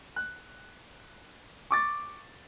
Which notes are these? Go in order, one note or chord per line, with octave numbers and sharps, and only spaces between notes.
F#6
C#6 D6 A6